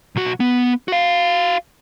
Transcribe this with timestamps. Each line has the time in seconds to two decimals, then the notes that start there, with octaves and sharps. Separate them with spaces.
0.16 B1 F#4
0.40 B3
0.88 F#4 F5